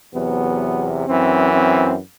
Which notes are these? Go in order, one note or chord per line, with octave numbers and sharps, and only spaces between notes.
E2 C3 F#3 B3
F#2 E3 C4
C4